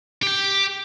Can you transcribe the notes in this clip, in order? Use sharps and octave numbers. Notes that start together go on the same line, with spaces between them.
G4 G5